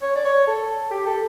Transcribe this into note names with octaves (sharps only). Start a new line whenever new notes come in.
C#5
D5
C#5
A4
G4
A4